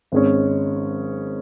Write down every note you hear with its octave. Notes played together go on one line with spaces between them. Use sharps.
G#1 G#2 G#3 C#4